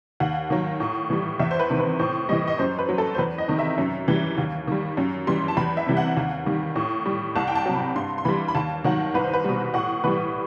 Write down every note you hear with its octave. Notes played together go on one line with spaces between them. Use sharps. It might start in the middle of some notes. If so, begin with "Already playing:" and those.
D#2 F#5
D#3 F#3
A2
E3 G3
E2 E5
C5
B4
C3 D#3
B4
A2 C5
E3 G3 D#5
D#5
F#2 C5
B4
F#3
A4
C5
E2 B4
D#5
C3 D#3
E5
F#2
E3 G3
D#2
D#3 G3
F#2
E3 G3 C6
A5
E2 B5
E5
C3 E3 G3
F#5
D#2
D#3 G3
A2
G3
C2 A5
G5
A5
C3 F#3
B5
G2 C6
C6
E3 G3 B5
B5
D#2 A5
D#3 F#3 F#5
C2 B4
C5
B4
B2 G3
A2 F#5
E3 G3 B4